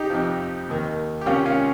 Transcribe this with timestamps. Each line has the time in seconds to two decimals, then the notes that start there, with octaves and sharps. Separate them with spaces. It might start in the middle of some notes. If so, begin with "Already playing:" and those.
Already playing: D#4 G4
0.10 F2 C3 F3
0.69 D#2 D#3
1.21 G4
1.26 C#2 C3 D#3 C#4 F4
1.46 C#4 F4